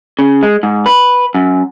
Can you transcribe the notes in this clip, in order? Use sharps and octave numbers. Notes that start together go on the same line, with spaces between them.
C#3
G#3
G#2
B4
F#2